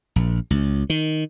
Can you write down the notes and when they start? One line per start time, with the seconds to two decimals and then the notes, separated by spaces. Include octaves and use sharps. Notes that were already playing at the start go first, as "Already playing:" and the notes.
0.16 A#1
0.51 C#2
0.90 D#3